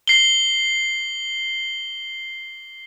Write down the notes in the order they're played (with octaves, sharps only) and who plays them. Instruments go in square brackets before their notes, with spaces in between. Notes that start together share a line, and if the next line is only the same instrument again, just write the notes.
[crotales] C7 G7